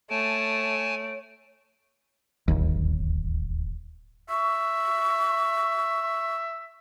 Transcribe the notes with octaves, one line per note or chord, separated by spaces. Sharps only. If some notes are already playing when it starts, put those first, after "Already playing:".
A3 C#5 G#5 A5 D7
D1 G1 D#2
E5 C#6